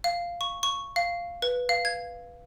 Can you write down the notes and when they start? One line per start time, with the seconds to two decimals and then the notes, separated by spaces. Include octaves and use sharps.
0.04 F5
0.41 C#6
0.63 C#6
0.96 F5
1.42 B4
1.69 F5
1.85 G#6